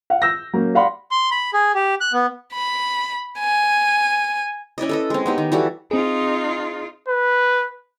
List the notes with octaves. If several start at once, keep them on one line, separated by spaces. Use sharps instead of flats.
F5 F#5
E6 G6 A#6
F#3 A#3 C#4
G4 D5 F5 F#5 B5 C6
C6
B5
G#4
G4
F#6
B3
B5
G#5
C#4 E4 D5 D#5
A4 B4 D#5
G#3 C4
B3 D#4 G4
D#3
E3 G3 F#4 A4
C4 D#4 F4 G#4
B4